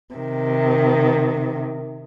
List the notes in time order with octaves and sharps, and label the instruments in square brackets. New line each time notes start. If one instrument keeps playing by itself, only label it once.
[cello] C3 D#3